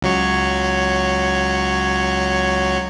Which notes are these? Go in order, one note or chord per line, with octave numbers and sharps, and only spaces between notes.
C#2 F#3 C#5